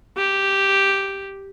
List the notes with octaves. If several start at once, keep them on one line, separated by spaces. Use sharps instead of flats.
G4